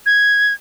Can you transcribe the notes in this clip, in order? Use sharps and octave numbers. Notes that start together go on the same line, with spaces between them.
G#6